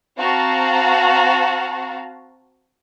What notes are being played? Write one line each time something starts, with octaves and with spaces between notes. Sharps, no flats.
C4 F#4 F5 A5 A#5